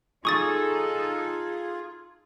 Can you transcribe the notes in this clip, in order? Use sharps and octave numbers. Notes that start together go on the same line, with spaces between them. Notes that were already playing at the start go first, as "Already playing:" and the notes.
D#4 F4 G#4 A4 C#6 D#6 A6